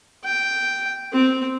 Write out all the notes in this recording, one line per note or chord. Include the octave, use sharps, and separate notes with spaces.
G5
C4